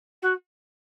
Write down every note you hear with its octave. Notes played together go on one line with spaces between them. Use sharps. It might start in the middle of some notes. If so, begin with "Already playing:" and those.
F#4